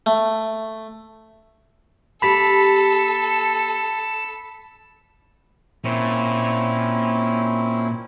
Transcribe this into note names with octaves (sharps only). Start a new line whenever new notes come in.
A3
A#3 G4 A4 A5 B5 B6
A#2 C4 C#4 E4